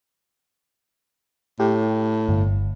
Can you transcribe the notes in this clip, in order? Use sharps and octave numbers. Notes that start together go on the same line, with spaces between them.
A2 G4
G1